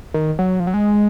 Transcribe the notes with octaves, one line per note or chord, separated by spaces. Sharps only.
D#3
F#3
F3
F#3
G#3